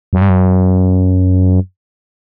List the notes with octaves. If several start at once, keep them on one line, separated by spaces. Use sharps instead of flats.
F#2
G2
F#2